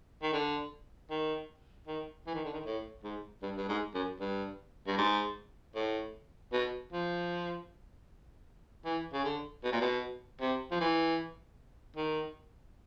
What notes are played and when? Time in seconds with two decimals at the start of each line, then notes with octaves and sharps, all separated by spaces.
0.22 D#3
0.33 D3
1.10 D#3
1.87 D#3
2.27 E3
2.35 D#3
2.45 D3
2.54 D#3
2.66 A2
3.04 G#2
3.42 G2
3.57 G2
3.69 G#2
3.94 F#2
4.20 G2
4.87 G2
4.98 G#2
5.75 A2
6.53 B2
6.93 F3
8.85 E3
9.13 C#3
9.24 D3
9.64 B2
9.73 A#2
9.81 B2
10.41 C3
10.71 F3
10.80 E3
11.97 D#3